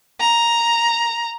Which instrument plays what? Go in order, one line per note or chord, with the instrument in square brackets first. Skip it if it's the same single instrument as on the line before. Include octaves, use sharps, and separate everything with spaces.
[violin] A#5